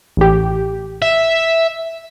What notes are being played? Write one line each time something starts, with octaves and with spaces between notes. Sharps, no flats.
A1 G4
E5